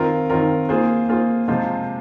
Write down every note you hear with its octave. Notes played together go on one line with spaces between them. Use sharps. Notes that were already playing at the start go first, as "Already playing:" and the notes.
Already playing: D#3 C4 F4 A#4
D#3 C4 F4 A#4
A#3 F4 G#4 C5
A#3 F4 G#4 C5
C3 F3 G#3 F4 C5